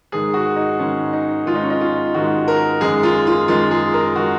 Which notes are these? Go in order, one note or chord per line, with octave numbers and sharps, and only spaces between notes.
G#2 D#3 G#3 G#4
F#4
D#4
G#2 D#3 G#3 C#4
D#4
G#2 D#3 G#3 F4
D#4
C#4
D#4
F4
G#2 D#3 G#3 F#4
A#4
F#2 D#3 G#3 G#4
F4
F4
F#2 D#3 G#3 F4
G#4
A#4
D#3 G#3 F#4